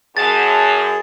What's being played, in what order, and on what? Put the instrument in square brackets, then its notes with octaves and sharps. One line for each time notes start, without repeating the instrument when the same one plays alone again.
[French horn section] F#2 [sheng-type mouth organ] G#4 [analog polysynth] A5 [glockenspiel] A6